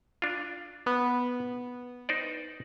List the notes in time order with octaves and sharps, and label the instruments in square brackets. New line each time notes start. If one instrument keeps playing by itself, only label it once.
[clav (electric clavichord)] D4 F4
[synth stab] B3
[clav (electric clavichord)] D#4 C5 D5